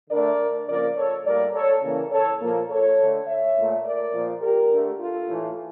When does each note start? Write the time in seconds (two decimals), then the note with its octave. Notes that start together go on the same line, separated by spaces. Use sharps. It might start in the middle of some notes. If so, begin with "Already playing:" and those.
0.10 D3 A3 A#4 D5
0.67 C#3 F3 A#3 A#4 D5
0.96 A4 C#5
1.26 A2 G3 A#3 A#4 D5
1.54 A4 C#5
1.83 C#3 E3 A#3
2.11 A4 C#5
2.41 A#2 F3 A#3
2.70 A4 C#5
2.99 D3 A3
3.26 C#5 E5
3.56 A#2 A3
3.85 A#4 D5
4.13 A#2 F3 A#3
4.42 G4 A#4
4.70 D3 A3
4.99 F4 A4
5.28 A2 E3 A3